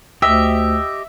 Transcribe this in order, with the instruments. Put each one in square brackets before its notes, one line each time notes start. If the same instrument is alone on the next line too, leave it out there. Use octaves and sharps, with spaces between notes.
[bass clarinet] D2 [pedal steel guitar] G4 D#5 [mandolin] E5